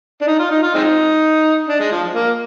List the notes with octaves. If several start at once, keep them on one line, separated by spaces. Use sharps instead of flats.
D4
D#4
F4
D#4
F4
G#3 C4 D#4
D4
G#3
F3
A#3